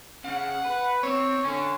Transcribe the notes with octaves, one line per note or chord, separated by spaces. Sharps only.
C#3 F#5
B4
C4 C#5
D3 C#4